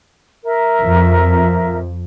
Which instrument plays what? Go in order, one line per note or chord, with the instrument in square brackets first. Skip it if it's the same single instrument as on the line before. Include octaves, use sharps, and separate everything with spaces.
[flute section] A#4 E5
[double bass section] F2